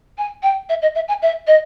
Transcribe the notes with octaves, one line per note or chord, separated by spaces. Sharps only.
G#5
G5
E5
D#5
E5
G#5
E5
D#5